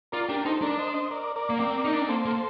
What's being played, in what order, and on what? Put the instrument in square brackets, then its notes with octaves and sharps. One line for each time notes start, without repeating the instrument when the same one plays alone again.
[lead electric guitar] F4 [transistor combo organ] A#4 D5
[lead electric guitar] D4 [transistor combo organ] G4 A#4
[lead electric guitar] D#4 [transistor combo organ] A4 C5
[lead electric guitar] D4 [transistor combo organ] A#4 D5
[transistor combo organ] C5 D#5
C5 D#5
A#4 D5
A#4 D5
[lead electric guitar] A#3
C4
D#4
D4
C4
[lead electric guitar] A#3 [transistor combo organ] A4 C5
[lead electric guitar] A#3